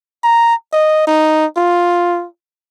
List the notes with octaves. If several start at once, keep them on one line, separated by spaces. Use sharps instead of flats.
A#5
D#5
D#4
F4